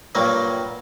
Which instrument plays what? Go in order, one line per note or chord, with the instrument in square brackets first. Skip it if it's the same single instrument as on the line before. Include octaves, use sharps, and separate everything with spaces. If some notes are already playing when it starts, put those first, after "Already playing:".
[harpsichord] G2 A#2 F#3 G3 A#3